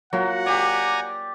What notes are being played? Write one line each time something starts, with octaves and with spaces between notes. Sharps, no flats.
F#3 A#3 F4 F#4 F#5
G4 D5 G#5 A#5